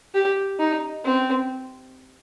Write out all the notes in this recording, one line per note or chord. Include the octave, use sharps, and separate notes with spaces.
G4
D#4
C4